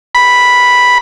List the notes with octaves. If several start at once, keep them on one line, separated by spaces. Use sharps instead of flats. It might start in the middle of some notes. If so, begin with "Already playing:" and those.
B5